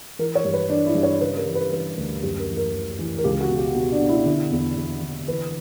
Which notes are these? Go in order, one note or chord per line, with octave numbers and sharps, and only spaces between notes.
E3 A#4
C#5
G2
B4
E3 D4
E4
G2
C#5
C#3 B4
A#4
E3
B4
E3 B4
D2
F#2 G4
A#4
E3
A#4
E3
E3
A#4
C#2 G4
F#4
B2
G4
B2 F#4
D4
B2
E4
D3 E4
E2
E2
D3
E3 B4